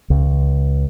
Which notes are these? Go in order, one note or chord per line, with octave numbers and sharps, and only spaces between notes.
C#2